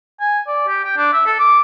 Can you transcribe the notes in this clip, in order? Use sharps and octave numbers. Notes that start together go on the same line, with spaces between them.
G#5
D5
G4
G5
D4
E5
A4
D6